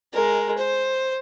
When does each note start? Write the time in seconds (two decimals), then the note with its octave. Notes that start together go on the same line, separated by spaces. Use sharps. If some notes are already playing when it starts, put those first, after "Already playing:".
0.14 G#3 A#4
0.58 C5